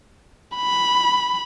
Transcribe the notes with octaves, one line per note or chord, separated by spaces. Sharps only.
B5